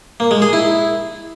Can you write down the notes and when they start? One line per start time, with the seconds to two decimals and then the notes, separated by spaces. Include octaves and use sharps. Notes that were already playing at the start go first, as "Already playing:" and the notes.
0.20 A#3
0.31 G#3
0.42 G#4
0.53 E4